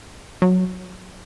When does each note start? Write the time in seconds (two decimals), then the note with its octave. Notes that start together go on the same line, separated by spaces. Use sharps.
0.42 F#3